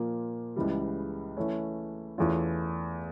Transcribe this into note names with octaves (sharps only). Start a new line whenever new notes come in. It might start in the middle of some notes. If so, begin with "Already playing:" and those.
Already playing: A#2 F3 A#3
C#2 C#3 E3 G3
E3 A3 C#4
E2 E3 A3 C#4 F4